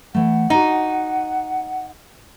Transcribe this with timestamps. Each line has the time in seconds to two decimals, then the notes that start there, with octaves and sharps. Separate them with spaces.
0.15 E3 A3 F#5
0.50 D#4 F#4 D5 D#5